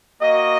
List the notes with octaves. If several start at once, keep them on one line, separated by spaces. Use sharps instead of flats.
A#3 F#4 D#5